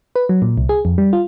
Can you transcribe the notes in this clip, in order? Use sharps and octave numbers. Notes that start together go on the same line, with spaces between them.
B4
F#3
A#2
C2
G#4
F2
G3
F4